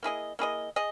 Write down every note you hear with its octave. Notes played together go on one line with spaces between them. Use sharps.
A#3 E4 G#4 D#5
A#3 E4 G#4 D#5
G#4 D#5